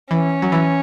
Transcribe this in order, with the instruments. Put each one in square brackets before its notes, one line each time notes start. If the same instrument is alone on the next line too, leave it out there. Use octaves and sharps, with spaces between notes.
[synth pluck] E3 [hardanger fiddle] C#4
[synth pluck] F#3
E3